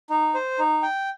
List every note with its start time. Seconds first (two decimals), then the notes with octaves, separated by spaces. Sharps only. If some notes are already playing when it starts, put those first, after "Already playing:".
0.10 D#4
0.35 C5
0.59 D#4
0.83 G5